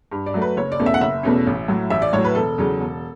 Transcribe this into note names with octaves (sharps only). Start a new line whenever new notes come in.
G2
D5
F#3 A3
B4
F#1 C#5
D5
E2 B2 A3 C#4
E5
F#5
F#1 E5
E2 B2 A3 C#4
A1
A2 F#3
A1 E5
D5
A2 F#3 C#5
B4
E1 A4
E2 C#3 F#3 C#4
E1